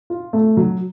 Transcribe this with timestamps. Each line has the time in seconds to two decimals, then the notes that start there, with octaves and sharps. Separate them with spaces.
0.10 F4
0.33 A3
0.57 F#3